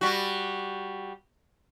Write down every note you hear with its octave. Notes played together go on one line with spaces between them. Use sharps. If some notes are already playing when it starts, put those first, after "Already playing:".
G3 F#4